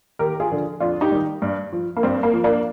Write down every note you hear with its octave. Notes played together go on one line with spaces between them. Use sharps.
D#2 G4 A#4
F4 G#4
D3 F3
F2 D4 F4
D#4 G4
D#3 G3
G2
F3
A#3
G2 C4
A#3
F3
A#3 D4